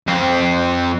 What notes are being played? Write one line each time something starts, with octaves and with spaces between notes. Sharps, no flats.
F2 C4